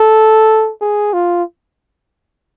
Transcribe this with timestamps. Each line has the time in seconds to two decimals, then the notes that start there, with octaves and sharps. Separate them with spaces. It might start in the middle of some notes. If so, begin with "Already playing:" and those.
Already playing: A4
0.81 G#4
1.13 F4